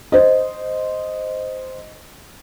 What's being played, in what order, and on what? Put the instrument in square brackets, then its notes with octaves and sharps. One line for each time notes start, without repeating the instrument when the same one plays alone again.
[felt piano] C5 D#5